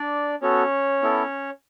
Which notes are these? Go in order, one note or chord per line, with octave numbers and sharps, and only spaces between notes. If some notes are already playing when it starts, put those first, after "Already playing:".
Already playing: D4 D5
B3 C#4 F#4 A4 C#5
B3 E4 A4